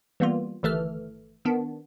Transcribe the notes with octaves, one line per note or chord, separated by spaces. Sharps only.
E3 G3 A#3 B3 F4
G1 D#3 E3 A3 A4 F6
D#3 B3 D4